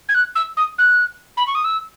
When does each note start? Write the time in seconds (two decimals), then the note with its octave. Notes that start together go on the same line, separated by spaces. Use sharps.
0.09 G#6
0.14 F#6
0.35 E6
0.57 D#6
0.78 F#6
1.37 B5
1.47 C#6
1.55 D#6
1.64 E6